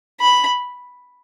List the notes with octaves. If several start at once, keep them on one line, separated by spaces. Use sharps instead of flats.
B5